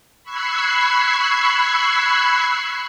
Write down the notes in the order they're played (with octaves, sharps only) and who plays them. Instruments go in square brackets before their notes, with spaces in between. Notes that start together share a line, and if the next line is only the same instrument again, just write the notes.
[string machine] B5 C#6 E6 F#6 G#6 C7